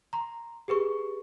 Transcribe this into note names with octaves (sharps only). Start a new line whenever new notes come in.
A#5 C6
G4 G#4 B4 C#6